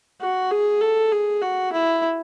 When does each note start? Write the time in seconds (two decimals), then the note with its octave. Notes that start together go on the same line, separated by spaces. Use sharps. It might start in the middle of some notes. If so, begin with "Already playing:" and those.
0.21 F#4
0.51 G#4
0.81 A4
1.12 G#4
1.42 F#4
1.73 E4